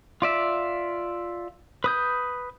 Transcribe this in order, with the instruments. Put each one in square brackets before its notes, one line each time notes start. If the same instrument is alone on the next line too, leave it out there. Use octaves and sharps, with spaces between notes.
[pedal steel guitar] F4 D5 E5
B4 D#6 G6